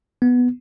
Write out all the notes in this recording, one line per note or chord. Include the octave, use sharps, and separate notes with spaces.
B3